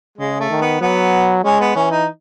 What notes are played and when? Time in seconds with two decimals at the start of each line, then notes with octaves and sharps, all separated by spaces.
0.18 C#3 G#3
0.40 A3
0.51 D#3
0.61 B3
0.81 F#3 B3
1.44 G#3 C#4
1.60 B3
1.75 E3 C#4
1.91 D#4